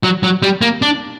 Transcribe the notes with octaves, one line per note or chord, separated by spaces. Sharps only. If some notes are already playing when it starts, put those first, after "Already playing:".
F#3
F#3
G3
A#3
D4